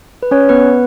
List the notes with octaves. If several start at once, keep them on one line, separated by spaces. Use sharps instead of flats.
B4
C#4 C#5
B3 B4